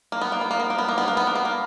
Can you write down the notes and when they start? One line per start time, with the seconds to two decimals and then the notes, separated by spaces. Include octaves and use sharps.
0.12 A#3
0.21 B3
0.32 A#3
0.41 B3
0.51 A#3
0.60 B3
0.70 A#3
0.78 B3
0.89 A#3
0.98 B3
1.08 A#3
1.17 B3
1.27 A#3
1.35 B3
1.45 A#3